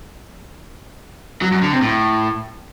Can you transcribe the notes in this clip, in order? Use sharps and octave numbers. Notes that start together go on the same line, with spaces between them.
F#3
F#2
D3
C3
A2